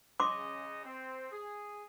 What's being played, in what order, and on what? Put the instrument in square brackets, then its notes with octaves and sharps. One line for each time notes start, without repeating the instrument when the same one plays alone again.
[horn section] C#3 D#5 [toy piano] C6 D6
[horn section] C4
G#4